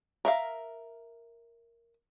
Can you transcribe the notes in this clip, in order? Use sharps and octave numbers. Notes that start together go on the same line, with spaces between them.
A#4 E5 F5